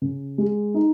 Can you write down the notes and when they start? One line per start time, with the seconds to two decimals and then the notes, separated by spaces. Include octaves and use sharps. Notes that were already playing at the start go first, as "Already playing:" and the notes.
0.02 C#3
0.38 G#3
0.74 D#4